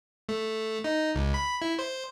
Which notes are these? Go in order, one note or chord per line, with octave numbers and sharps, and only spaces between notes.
A3
D#4
C#2
B5
E4
C5